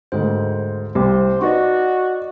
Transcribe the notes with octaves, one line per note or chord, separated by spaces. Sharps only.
D2 G#2 D#3 C5
C2 G4 C5
D#4 F#4 B4 D5 D#5 C#6